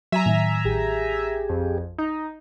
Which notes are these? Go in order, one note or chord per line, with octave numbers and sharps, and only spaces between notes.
F#3 E5 G#5 A#5
A2 D#3
A1 G4 G#4
F2
D#4